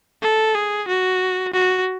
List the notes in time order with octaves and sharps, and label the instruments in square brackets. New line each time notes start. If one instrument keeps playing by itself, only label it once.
[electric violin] A4
G#4
F#4
F#4